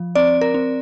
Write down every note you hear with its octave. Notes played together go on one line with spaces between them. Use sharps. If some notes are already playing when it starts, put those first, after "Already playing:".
Already playing: F3
C4 D5
A#4
C4